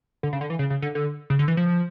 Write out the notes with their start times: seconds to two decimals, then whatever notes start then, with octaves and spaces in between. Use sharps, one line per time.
0.23 D3
0.33 C#3
0.41 D3
0.50 E3
0.59 C#3
0.70 C#3
0.82 D3
0.95 D3
1.30 C#3
1.39 D3
1.48 E3
1.57 F3